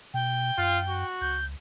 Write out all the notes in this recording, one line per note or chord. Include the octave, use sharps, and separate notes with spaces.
B2 G5
F#2 F4
F#4
C#2 G6